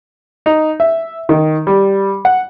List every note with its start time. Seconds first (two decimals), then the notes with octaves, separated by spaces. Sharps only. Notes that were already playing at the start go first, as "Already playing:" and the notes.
0.46 D#4
0.80 E5
1.29 D#3
1.67 G3
2.25 F#5